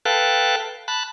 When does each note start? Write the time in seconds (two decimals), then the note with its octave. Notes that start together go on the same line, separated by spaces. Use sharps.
0.05 A4 B4 F5 G5 A5 F#6
0.88 A5 B5 F#6